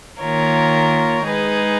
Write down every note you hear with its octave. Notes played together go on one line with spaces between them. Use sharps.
D#3 A#3 F4 A#4 C#5
G#3 D#4 G#4 B4